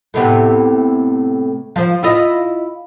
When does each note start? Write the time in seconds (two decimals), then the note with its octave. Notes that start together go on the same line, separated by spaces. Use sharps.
0.14 A2 C3 B3
1.76 F3 C5
2.03 E4 F4 D#5